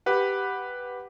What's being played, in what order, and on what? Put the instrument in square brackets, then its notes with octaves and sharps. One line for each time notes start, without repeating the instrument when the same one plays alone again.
[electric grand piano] G4 B4 F#5